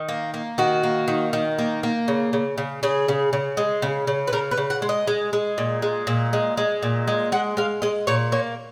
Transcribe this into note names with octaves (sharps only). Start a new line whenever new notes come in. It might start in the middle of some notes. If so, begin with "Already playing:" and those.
Already playing: D#3
A#3
A#3
D#3 F#4
A#3
D#3
D#3
A#3
A#3
C#3
C#3
C#3
C#3 G#4
C#3
C#3
G#3
C#3
C#3
B4
C#3 A#4
B4
C#3
F#5
G#3
D#5
G#3
G#3
A#2
G#3
A#2
G#3
G#3
A#2
G#3
G#3 F#5
G#3 F5
G#3 D#5
A#2 C#5
A#3 C#5